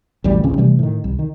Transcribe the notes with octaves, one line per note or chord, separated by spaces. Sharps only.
A1 D2 E3 G3
A1 C#3 C4 C#4
C3 E3 G3 A3
A2 D#3
C2
D#3